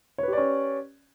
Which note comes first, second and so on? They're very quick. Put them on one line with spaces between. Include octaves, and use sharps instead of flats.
C#5 B4 G4 D5 C#4